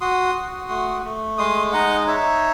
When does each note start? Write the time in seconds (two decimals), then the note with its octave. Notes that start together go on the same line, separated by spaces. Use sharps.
0.01 F#4 C6 D#6
0.35 F#4
0.69 A3
1.04 A3
1.38 G#3 C6 D#6
1.73 D#4 D#5 F#5
2.07 D#4 C#5 E5